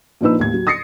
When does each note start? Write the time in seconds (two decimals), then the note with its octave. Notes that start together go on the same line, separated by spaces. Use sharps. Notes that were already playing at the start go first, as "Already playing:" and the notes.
0.21 A#2 F3 D4 D#4 B4 E6
0.39 D#2 A2 G#6
0.54 F#3
0.67 D#6 A6 A#6 C7 C#7